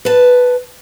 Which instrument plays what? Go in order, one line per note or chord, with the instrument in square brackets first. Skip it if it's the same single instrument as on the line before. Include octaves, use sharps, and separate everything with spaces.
[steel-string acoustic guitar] B4 A5